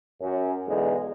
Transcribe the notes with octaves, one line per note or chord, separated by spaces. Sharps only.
F#2
B1 E2 D3 G#3